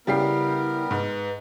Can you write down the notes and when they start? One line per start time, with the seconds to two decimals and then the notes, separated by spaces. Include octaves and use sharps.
0.07 C#3 G3 B3 E4 G4 A#4 C7
0.91 G#2 B4